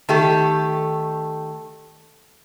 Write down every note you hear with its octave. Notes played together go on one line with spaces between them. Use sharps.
D#3 A3 G4 A4